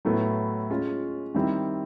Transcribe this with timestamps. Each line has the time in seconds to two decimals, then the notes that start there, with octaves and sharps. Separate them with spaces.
0.05 A2 F#3 B3 E4 A4
0.70 G#3 C#4 F4
1.34 D#3 G3 C4 E4